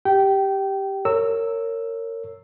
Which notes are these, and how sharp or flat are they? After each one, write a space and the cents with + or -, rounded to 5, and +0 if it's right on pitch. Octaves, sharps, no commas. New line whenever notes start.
G4 +0 G5 -20
A#4 -25 C#5 +0 E6 +0